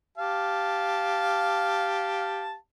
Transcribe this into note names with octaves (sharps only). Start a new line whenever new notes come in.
G4 F5 A5